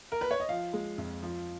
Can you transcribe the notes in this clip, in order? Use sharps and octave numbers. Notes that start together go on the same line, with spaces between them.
A#4
B4
C#5
D#5
F3 F5
G#3
F2
F3